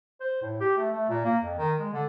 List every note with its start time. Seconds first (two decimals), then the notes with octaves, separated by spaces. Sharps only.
0.20 C5
0.42 A2
0.60 G4
0.77 A3
0.92 A3
1.09 A#2
1.25 A#3
1.43 F2
1.58 D#3
1.79 G#3
1.93 D3